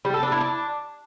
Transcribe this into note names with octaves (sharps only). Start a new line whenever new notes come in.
G3
A4
D4
E4
D4